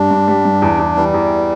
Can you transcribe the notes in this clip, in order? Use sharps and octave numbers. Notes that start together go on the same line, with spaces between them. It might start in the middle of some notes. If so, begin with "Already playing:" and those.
Already playing: G2 G3 D4
G2
G3
G2
E2
E2
E3 G3
E2